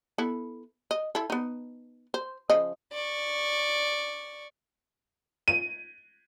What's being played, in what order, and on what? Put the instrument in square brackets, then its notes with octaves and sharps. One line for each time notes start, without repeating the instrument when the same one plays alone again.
[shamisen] B3 E4 A4
D#5
E4 A4
B3 D#4
C5
C#3 F3 D#5
[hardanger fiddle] D5 C#6
[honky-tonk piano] D#7